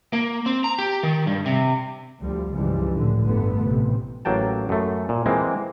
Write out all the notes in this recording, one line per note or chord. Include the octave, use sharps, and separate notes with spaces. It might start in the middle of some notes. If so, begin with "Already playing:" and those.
A#3
C4
A#5
G4
D#3
G2
C3
D2 F3 G3
C#2 G2 E3 F3 G3
A2 D3
G1 D3 A3 B3
A1 C3
A1 F#3 A#3 G5 A5
F#2 A3
A#2
E3 G#3 A#3 C4